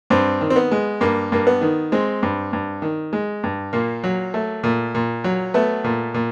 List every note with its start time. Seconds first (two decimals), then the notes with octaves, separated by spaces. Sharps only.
0.10 G2 C4
0.41 D#3
0.50 C4
0.56 B3
0.71 G#3
1.01 G2 A#3
1.32 G2 A#3
1.47 B3
1.61 D#3
1.92 G#3 C4
2.23 G2
2.53 G2
2.82 D#3
3.13 G#3
3.43 G2
3.73 A#2 A#3
4.04 F#3
4.34 A3
4.63 A#2
4.95 A#2
5.24 F#3
5.54 A3 B3
5.84 A#2
6.14 A#2